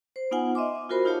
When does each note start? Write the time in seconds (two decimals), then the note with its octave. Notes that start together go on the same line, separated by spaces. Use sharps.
0.16 C5
0.31 B3 D#4 F4 F#5 G#5
0.55 D#5 E5 C6 D6
0.90 F4 F#4 A#4 C5 B5
1.05 D#4 F4 G4 C#5 F5 A5